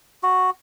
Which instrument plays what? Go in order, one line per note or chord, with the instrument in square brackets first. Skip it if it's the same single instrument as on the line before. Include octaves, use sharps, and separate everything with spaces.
[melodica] F#4